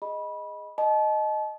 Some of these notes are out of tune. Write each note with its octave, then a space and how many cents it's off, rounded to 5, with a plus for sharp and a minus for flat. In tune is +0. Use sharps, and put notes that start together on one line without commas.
G#4 +0 D#5 +0 B5 -20
D#5 -5 A5 -35